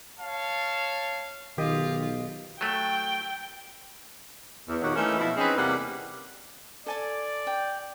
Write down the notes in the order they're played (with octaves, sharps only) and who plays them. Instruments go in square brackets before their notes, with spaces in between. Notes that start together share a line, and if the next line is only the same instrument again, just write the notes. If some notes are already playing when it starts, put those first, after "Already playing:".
[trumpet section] C#5 F5 A5
[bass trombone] B1 [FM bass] D#3 [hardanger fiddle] F4 [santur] G4 D#5
[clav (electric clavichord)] F#3 A3 [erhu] G5
[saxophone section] E2
A#2 D#3 F#3 D#4 F#4 G4
E3 A3 A#3 C#4 D#4 E4
B2 F3 B3 E4
C4 C#4 D#4 G#4 B4
E2 C3 G3 A#3 G4 F#5
[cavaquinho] A4 G#5 A5 [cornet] D5
[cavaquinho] G5